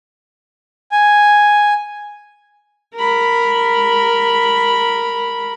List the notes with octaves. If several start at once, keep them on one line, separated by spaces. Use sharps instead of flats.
G#5
A#4 B5